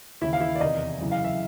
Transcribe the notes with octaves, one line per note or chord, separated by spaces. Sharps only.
D#2 C#3 E3 E4 E5
F5
E4 E5
D5
E2 C3 D#3 D#4 D#5
F#2 C#3 E3
F5
E5